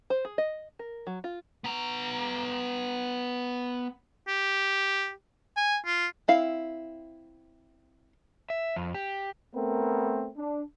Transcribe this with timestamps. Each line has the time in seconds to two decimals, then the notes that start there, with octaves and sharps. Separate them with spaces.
0.10 C5
0.25 G#4
0.38 D#5
0.79 A#4
1.07 F#3
1.24 F4
1.64 B3 A#5
4.28 G4
5.57 G#5
5.86 F4
6.28 C4 E4 F5
8.50 E5
8.76 F2
8.94 G4
9.54 A3 B3 C4 A#4
10.37 D4